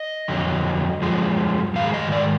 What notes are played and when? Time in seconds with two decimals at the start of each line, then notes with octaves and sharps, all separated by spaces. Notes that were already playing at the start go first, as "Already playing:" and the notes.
Already playing: D#5
0.28 F2 D3 F#3
1.02 F#2 F3 G#3
1.75 G#2 D#3 G#3 F5
1.94 D#5
2.12 D5